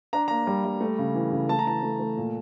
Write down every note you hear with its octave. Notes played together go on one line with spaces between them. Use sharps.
D4 A#5
A#3 A#5
G3
G3
A3
C#3
E3
C#3
A3 A5
A#5
E3 A5
A3
A3
A#2